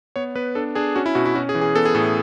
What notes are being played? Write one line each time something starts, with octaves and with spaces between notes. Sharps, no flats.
B3 C#5
B3 B4
D4 A4
D4 G#4
C#4 F#4
E4
B2 F#4
E4
C#4 F#4
G#4
E3
G#4
B3 A4
G#4
A2 A4